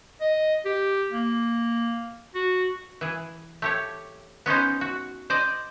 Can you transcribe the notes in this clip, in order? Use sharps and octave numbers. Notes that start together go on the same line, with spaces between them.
D#5
G4
A#3
F#4
E3 G#4
A3 G4 C#5
B3 C#4 D#4 C5
F#4
C5 D5 D#5